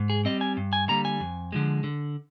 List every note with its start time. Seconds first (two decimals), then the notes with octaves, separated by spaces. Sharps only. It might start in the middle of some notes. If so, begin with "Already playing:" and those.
Already playing: G#2
0.10 G#4
0.25 G3 C4 D#5
0.41 G#5
0.57 G2
0.73 G#5
0.88 D3 G3 A#3 A#5
1.05 G#5
1.20 F2
1.52 D3 F3 G#3
1.84 D3